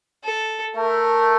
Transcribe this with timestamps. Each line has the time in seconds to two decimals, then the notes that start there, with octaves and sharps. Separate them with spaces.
0.24 A4
0.76 A3 A#4